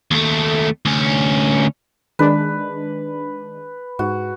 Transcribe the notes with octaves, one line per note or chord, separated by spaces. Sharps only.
D#2 A3
D2 C#4
D#3 G#3 D4 B4
G#2 F#4